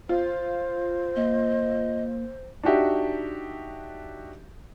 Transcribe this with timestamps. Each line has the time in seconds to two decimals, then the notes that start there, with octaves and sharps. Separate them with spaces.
0.09 F4 C5
1.16 A#3 D#5
2.63 D4 D#4 F#4 G4 E5